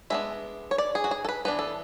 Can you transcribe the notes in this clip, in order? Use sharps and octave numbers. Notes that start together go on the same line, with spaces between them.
G#3 B3 D4 E5
C#5
D5
G#4
F#4
G#4
A4
B4
E3 B3 D4 B4
A4